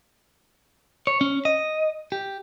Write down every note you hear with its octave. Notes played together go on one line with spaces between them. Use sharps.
C#5
C#4
D#5
G4